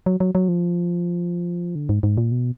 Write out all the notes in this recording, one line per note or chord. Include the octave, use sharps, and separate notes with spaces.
F#3
F#3
F#3
F3
D3
G#2
G#2
A#2
B2